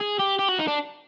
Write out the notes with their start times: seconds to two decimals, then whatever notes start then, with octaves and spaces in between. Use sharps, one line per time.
0.01 G#4
0.20 G4
0.39 G4
0.48 F#4
0.59 D#4
0.67 D4